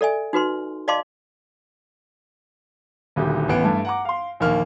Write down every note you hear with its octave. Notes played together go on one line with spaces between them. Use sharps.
A4 D5 E5 G#5
D#4 F#4 B4 C6
D5 D#5 F5 A5 C6 D6
D#1 D2 G4
A1 B3 D7
G2 A3
F#5 A#5 D6
F5 C6
A#1 D#2 D#3 A#3 F6